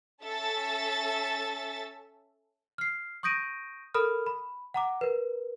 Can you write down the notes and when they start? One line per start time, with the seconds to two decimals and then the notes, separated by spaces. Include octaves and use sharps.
0.23 C#4 A4 E5 A6
2.78 F6 C7
3.23 C#6 D#6 G6 A#6 D7 D#7
3.94 A4 A#4 B5 D#6 F6
4.26 B5
4.74 F#5 A#5 D6
5.01 A#4 B4